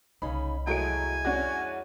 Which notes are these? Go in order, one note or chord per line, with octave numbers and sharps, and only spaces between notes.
C2 C#3 C#4 D#4 B5
F2 F#3 G#3 A3 E4 G#5 D7
C#4 D4 F#4